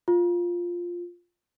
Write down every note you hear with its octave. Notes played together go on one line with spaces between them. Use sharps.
F4